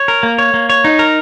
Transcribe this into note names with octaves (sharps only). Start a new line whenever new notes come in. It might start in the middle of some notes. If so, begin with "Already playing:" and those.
Already playing: C#5
A#4
A#3
C#5
A#3
C#5
D#4
A#4